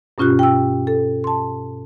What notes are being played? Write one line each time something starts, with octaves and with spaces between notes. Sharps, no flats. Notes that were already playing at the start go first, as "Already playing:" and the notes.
G2 B2 C#4 F4 G4 F#6
G5 E6
A4
A5 C6